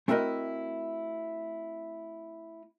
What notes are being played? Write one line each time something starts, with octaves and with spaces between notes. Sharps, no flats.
A3 C4 E4 F#4 A#4 D#5